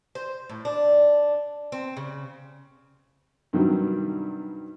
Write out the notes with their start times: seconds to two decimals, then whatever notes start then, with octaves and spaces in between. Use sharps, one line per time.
0.15 C5
0.49 A2
0.65 D4
1.72 C4
1.97 C#3
3.53 G2 C3 D#3 F#3 G3